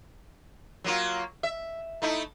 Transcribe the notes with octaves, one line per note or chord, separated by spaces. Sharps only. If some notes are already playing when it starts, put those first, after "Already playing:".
F#3 A#3 F4
E5
A3 D#4 E4